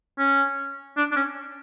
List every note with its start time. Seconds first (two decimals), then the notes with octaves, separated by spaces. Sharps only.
0.18 C#4
0.97 D4
1.12 D4
1.16 C#4